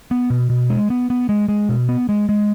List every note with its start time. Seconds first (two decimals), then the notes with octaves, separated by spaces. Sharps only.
0.11 B3
0.30 B2
0.50 B2
0.70 G#3
0.90 B3
1.10 B3
1.29 G#3
1.49 G#3
1.69 B2
1.88 B3
2.09 G#3
2.29 G#3